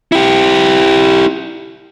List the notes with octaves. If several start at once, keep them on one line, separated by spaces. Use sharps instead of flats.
E4 G4